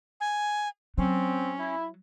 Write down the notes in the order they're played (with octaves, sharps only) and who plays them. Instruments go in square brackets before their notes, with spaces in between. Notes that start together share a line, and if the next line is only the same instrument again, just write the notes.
[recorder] G#5
[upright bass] F#3 [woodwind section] C4 [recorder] C#4
[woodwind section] E4